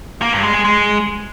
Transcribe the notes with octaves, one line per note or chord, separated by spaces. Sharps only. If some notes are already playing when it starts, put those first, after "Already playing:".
A#3
G2
G#3
G#3
G#3